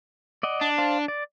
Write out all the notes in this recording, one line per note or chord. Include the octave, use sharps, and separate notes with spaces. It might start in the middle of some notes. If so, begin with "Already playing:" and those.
D5 D#5 F#5
D4
C5 F5 A5
D5